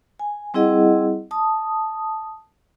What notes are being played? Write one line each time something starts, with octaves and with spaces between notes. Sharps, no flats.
G#5
G3 C4 E4 G#4 D#5 F#5
A5 D#6